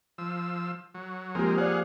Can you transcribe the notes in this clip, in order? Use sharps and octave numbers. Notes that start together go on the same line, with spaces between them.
F3 E6
F#3
F3 G#3 A#3 C4 G4 A#4
G#4 C5 D5 F5 F#5